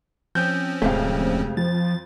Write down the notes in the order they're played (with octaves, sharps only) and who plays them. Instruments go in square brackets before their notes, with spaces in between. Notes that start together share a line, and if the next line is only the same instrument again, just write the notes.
[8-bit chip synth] F3 C4 C#4 [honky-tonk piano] G6
[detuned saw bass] D1 [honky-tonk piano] F2 F5 [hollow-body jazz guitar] C3 G#3 A3
[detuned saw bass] F3 [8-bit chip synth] A6